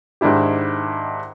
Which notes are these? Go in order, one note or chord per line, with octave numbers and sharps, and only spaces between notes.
G#2 D#3 D4 E4 G4